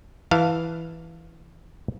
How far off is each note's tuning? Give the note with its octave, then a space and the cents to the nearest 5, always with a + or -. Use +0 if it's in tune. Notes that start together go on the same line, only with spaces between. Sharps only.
E3 +0 F5 +0 A5 +10